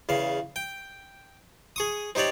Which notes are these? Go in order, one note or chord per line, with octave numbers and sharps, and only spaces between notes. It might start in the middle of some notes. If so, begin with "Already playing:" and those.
E2 C#3 F5
G5
G#4 C#6 D#6
C4 D#4 G4 C#5 D5